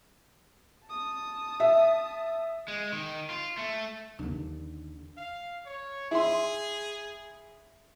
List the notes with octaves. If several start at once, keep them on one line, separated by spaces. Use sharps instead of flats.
A5 D#6
E5
G#3
D#3
F4
A3
D#2 D3
F5
C#5
E4 G#4 C6